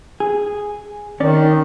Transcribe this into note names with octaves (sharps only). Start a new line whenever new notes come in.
G#4
D#3 C#4 D5